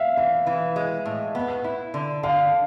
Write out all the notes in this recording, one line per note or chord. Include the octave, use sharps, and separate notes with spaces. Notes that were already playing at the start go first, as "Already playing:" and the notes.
Already playing: E5 F5
E3 F5
E3
G#3
A2
B3
E4
D3
D3 F5